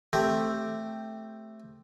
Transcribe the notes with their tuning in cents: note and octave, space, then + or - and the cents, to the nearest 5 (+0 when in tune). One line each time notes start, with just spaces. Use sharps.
A3 +0 C4 +0 G4 +0